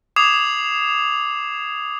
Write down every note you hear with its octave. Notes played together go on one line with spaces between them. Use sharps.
D6 D#6 G#6 C7 E7 F7